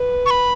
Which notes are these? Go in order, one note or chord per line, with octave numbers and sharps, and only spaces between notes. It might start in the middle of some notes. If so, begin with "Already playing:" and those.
Already playing: B4
C#6
B5